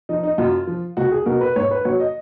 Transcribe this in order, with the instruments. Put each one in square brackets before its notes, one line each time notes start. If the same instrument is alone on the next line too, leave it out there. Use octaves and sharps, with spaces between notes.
[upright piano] F3 D#4
D#4
F#2 F4
F3
C#2 F#4
G#4
B2 F#3 A#4
B4
G#2 C#5
B4
F#3 C#5
D#5